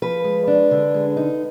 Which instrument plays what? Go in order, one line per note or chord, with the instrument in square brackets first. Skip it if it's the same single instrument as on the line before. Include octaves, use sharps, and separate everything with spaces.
[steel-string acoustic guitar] F3 B4
G#3
D4
D3
G#3
D#4